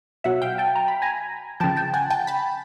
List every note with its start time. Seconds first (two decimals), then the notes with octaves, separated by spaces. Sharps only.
0.24 B2 F#3 E5 F#5
0.42 F5 G5
0.58 G5 A5
0.76 A#5
0.88 B5
1.02 G#5 A#5
1.60 C#3 F3 G5 A5
1.76 G5 A5
1.94 F#5 G#5
2.10 G5 A5
2.27 A5 B5